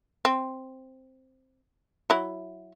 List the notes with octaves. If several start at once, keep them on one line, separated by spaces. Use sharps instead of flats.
C4
F#3 E4